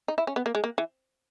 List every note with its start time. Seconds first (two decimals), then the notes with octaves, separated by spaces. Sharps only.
0.08 D#4
0.18 E4
0.27 C#4
0.36 B3
0.46 A#3
0.55 G#3
0.64 A#3
0.78 E3